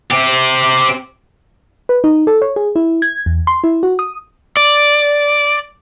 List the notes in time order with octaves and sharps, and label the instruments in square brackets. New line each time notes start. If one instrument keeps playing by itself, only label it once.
[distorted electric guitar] C4 G4
[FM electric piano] B4
D#4
A4
C#5
G#4
E4
G#6
E2
C6
E4
F#4
D#6
[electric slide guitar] D5